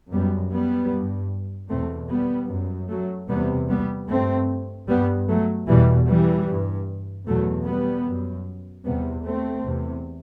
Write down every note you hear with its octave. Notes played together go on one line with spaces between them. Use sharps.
F#2 G3 B3
G3 B3
G2
E2 B2 A3 C4
G3 B3
F#2
F#3 A3
E2 C3 G3 B3
G3 B3
G2 A3 C4
G2 G3 B3
F#3 A3
E2 B2 E3 G3
E3 G3
G2
E2 B2 F#3 A3
G3 B3
F#2
E2 C3 G3 B3
A3 C4
E2 C3